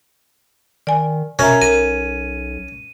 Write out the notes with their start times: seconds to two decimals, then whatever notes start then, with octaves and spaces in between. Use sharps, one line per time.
0.87 D#3 D5 G#5
1.39 B2 C#4 A#4 E5 A#5
1.62 B1 A#4 D#7